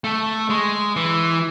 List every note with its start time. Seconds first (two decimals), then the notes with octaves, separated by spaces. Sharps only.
0.04 A3
0.50 G#3
0.96 E3